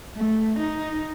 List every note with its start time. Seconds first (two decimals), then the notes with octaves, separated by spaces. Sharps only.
0.16 A3
0.59 D#4